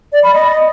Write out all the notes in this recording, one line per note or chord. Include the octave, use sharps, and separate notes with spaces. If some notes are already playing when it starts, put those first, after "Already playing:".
D5
B5
D#5